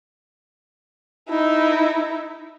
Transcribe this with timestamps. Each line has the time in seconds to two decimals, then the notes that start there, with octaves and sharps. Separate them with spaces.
1.29 D#4 E4